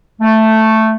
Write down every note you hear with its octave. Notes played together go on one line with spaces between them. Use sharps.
A3